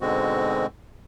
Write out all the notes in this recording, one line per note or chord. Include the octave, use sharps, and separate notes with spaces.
G#2 B2 D3 G#3 C4 F#4